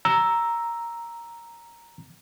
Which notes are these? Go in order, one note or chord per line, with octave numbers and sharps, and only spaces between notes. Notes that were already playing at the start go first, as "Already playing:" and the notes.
A#5 E6